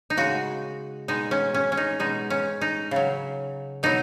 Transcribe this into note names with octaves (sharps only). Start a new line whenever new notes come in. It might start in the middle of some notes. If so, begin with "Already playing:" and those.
D#4
C#3 G#3 F#4
B2 G#3 D#4
C#4
C#4
C#4
D#4
B2 G#3 D#4
C#4
D#4
C#3 F#3
B2 F#3 D#4